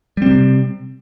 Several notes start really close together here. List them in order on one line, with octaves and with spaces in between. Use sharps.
G3 C4 C3